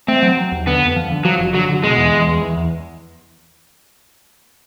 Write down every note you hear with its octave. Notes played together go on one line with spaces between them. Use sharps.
A3 C4
F#3
F#3
D#2
D3 B3
F2
F3
D3
F3 F#3
F#1
D3 F#3
D3
B2 G#3
E2
E2
E2
E2
E2